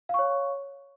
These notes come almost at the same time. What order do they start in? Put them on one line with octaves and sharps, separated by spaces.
F5 C#6 C#5